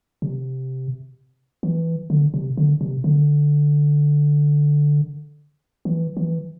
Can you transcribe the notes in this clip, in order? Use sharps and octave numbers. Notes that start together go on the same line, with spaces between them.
C3
E3
D3
C3
D3
C3
D3
E3
E3